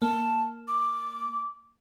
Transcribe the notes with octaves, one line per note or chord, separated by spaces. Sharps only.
A#3 A5
D6